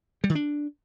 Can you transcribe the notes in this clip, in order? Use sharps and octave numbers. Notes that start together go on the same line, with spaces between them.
G3
D#3
D4